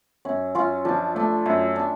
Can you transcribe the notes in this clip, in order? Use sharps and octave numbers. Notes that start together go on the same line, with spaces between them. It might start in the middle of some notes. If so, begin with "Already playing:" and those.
F#2 C#4
F#2 C#4 F4
F3 D4
A3 D4
F#2 C#4
D4